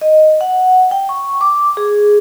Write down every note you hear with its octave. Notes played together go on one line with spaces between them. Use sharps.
D#5
F#5
G5
C#6
D6
G#4